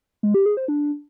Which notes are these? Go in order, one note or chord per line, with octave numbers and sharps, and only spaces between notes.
G#3
G4
G#4
C5
D4